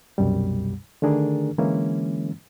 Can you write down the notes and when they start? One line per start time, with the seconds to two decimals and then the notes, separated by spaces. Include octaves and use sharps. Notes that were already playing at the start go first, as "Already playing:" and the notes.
0.18 C2 F#2 B2 G3
1.02 D3 D#3 A3 D4 G#4 A#4
1.58 D3 E3 G#3 A#3 C#4 E4